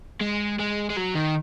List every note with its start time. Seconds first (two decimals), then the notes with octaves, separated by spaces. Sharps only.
0.21 G#3
0.59 G#3
0.90 G#3
0.97 F#3
1.15 D#3